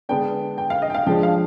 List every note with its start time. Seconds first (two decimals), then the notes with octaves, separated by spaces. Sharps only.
0.09 D3 G#3 B3 D4 G5
0.58 G5
0.70 F5
0.82 D#5
0.90 G5
0.94 F5
1.06 F3 G#3 D4 G5
1.23 F5